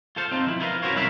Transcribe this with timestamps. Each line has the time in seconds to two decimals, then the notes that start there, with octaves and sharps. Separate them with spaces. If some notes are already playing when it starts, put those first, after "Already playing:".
0.16 F4 A4 C5 F5
0.31 C4 D#4 F4
0.47 F3 E4
0.60 E4 F4 A#4 B4 F5
0.82 C#4 E4 F#4 A#4 C5 C#5
0.95 C2 D#4 A#4 B4 E5 F5